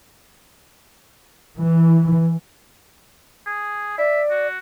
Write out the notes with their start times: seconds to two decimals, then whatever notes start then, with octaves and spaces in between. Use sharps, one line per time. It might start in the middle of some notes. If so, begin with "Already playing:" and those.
1.57 E3
3.46 G#4
3.98 D5 E5
4.30 F#4